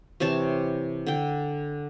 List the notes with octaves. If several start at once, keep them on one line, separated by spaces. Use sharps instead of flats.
C3 E3 C#5 A5
D3 G5